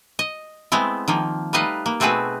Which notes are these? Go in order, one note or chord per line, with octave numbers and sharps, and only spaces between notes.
D#5
G#3 A3 B3 C4 E4
D#3 F3 A#3
G3 A3 D#4 B4 D#5 F5
A#3
B2 A3 C4 F#4 G#4 B4